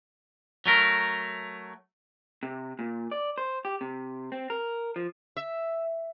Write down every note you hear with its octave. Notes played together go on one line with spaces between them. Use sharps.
F#3 A3 A#4
C3
A#2
D5
C5
G4
C3
C4
A#4
F3
E5